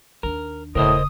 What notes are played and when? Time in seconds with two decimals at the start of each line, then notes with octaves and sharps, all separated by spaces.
0.23 D#2 D4 A#4
0.75 E1 A2 C#3 A#4 C5 D#5 D#6